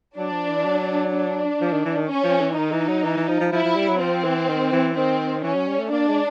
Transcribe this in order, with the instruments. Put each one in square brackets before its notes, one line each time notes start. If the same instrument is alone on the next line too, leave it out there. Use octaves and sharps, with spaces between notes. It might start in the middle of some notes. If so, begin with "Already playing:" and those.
[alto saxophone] F#3 [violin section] D4
[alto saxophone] F3
E3
F#3
[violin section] D4
[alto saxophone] F3
D#3
E3
D#3
[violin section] C#4
[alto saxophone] F3
E3
[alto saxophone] D#3 [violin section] D#4
[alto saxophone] E3
F#3
E3
E3
F3
F3
[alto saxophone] F3 [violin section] E4
[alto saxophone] F3
G3
F#3
[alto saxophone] F3 [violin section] C4
[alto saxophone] E3
D#3
E3
[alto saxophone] D#3 [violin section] C4
[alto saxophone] E3 [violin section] C#4
[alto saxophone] F#3
G3
A3
[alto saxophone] A#3 [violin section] D4
[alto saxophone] G#3